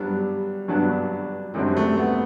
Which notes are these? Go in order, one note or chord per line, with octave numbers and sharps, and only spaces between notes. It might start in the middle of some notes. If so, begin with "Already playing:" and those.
Already playing: G2 F#3 G3 B3 D4
G2 F#3 B3 D4
F#2 D3 F#3 G3 C4
A3
B3